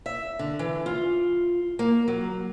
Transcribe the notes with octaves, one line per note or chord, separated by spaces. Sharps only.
E5
D3
E3
F4
A#3
F#3